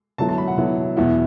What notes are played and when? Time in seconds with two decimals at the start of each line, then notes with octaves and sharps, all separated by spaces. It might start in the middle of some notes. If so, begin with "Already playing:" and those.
0.18 D3 F#3 B3 E4 A5
0.29 A5
0.38 B5
0.48 F#5
0.58 D3 F#3 B3 E4
0.97 E2 B2 B3 E4